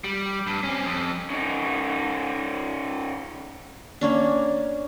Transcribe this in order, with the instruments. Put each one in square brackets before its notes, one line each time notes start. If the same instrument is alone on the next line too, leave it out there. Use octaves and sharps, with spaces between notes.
[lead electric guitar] G3
G2
C4 C#4
F2
[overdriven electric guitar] C#3 D#4
[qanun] A#3 C#4 D4